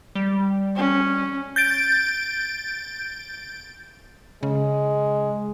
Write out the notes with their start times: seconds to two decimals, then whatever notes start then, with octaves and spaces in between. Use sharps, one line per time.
0.15 G3
0.76 C#4
1.56 G6 A6 D7
4.43 C#3 G#3